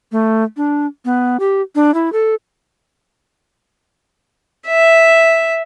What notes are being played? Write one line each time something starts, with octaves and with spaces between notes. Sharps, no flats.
A3
D4
B3
G4
D4
E4
A4
E5